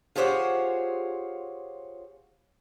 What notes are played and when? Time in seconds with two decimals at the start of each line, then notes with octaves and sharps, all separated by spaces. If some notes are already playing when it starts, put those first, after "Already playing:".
0.16 F4 G4 G#4 C5 C#5 F#5